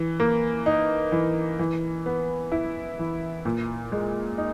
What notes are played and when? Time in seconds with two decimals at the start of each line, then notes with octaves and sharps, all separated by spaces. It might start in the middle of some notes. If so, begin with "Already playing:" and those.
Already playing: E3
0.20 A#3
0.66 D#4
1.12 E3
1.59 E3
2.06 B3
2.52 E4
2.99 E3
3.45 A#2
3.92 G#3
4.38 D#4